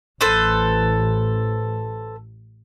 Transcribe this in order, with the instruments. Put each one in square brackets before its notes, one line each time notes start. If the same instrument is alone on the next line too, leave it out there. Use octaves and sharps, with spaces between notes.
[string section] A1 [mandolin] A4 B4 C5